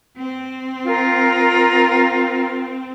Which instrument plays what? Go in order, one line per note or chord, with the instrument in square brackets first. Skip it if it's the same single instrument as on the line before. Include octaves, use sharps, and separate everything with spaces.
[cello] C4
[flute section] F4 A#4